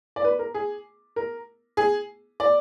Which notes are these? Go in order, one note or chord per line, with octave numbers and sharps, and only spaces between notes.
D5
B4
A#4
G#4
A#4
G#4
D5